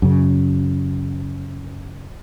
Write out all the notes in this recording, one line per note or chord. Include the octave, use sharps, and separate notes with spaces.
F#2 C#3